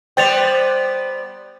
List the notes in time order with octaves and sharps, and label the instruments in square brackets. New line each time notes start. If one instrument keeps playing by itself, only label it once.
[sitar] G3 B3 C5 [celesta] G5 A6 F7